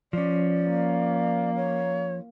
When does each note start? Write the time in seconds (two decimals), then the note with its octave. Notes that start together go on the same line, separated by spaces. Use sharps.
0.13 F3 C#4 D5
0.68 A#3
1.56 C#5